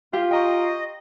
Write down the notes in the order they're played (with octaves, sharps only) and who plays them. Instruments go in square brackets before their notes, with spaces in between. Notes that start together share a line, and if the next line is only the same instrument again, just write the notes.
[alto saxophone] F4 [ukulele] G4 F5
[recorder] D#5 [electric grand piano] G5 A#5 C#6